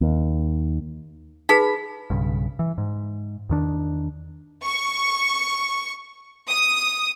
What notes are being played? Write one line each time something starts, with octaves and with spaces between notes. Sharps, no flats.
D#2
D#4 G#4 B4 B5
B1 G2 C#3
E3
G#2
E2 D#3 D4
C#6
D#6